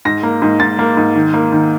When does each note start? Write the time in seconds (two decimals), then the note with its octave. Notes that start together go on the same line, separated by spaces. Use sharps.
0.05 G#2 A#6
0.23 A#3
0.42 G#2
0.60 G#2 A6
0.79 A#3
0.97 G#2
1.15 D#3
1.34 A#3
1.52 D#3